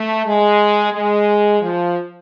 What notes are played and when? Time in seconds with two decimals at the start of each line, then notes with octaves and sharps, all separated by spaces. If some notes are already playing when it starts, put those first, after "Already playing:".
Already playing: A3
0.25 G#3
0.93 G#3
1.61 F3